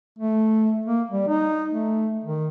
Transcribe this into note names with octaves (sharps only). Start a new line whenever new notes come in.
A3
A#3
G3
D#4
A3
D#3